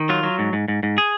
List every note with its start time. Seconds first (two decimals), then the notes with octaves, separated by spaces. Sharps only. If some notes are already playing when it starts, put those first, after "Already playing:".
Already playing: D#3
0.09 F#3 F4
0.23 F#3
0.39 G#2
0.53 G#2
0.68 G#2
0.83 G#2
0.98 G#4